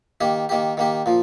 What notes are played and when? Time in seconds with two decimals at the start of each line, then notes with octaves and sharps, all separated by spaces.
0.21 D#3 A#3 G4
0.49 D#3 A#3 G4
0.77 D#3 A#3 G4
1.06 A#2 F3